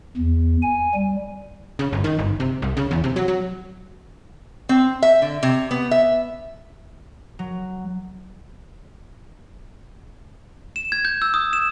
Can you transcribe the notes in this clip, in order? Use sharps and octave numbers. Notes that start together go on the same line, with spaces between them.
E2
G#5
G3
C#3
G1
D#3
G1
C3
C2
C#3
E2
C3
F#3
F#3
C4
E5
D3
C3
B3
E5
F#3
E7
G#6
G6
E6
D#6
E7